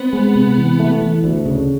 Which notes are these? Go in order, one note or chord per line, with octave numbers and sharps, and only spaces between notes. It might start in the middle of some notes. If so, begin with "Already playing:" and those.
Already playing: B3 C4
G#3
C3
E3
A3
E3
D2
C#3